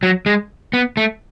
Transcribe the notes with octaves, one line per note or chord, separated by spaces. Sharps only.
F#3
G#3
B3
A3